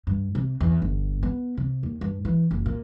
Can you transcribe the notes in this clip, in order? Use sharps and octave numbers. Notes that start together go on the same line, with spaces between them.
G2
C3
E2
G1
B3
C3
D#2
G2
E3
F#1
A#2